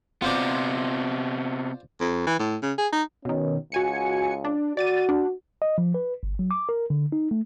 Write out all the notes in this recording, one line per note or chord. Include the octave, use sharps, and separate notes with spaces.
C3 B3 F4 C5 D5
F2
E3
A2
C#3
G#4
D#4
B2 D#3 C#4
C#2 F#4 G#5 C#7
D4
F#4 D5 A6 D#7
D4
D#5
F3
B4
G1
F#3
D6
A#4
D3
D#4
A3